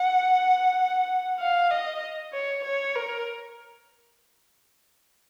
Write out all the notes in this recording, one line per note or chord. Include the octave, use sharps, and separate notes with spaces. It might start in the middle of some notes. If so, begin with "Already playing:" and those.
Already playing: F#5
F5
D#5
C#5
C#5
A#4